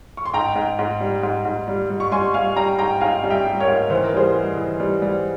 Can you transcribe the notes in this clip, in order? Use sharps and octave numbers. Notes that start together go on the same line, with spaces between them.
C#6
C6
G#2 G5 A#5
G#2
G#2
G3
G#2
G#2
G3
G3
C#6
G3 G#5 C6
G3 F5 G#5
G3 G5 A#5
G#2 G5 A#5
G#2 F5 G#5
G3
E5 G5
G3
A#4 C#5
G#2
E3 C5
A#4
G3 G#4 C5
G3
E3
G3
G3